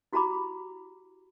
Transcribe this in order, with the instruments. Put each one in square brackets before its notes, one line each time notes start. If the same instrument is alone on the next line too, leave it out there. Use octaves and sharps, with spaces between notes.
[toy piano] E4 F#4 G4 A#5 B5 D6